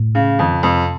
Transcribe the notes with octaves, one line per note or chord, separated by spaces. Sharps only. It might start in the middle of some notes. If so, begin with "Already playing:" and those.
Already playing: A2
C#3
F2 D#3
C#3
F2 C3